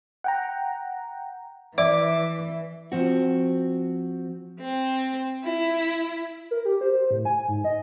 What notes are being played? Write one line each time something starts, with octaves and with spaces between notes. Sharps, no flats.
F#5 G5 A#5
E3 D5 E5 D6
F3 C4 F#4
C4
E4
A#4
G4
C5
A2
G#5
G#2
D#5